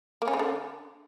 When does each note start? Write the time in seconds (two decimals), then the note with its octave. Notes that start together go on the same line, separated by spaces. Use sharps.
0.22 A#3
0.28 C#4
0.33 C#3
0.39 D3